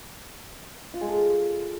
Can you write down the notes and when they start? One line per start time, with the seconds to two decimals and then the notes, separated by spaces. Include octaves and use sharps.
0.94 F4
1.01 G#3
1.08 A4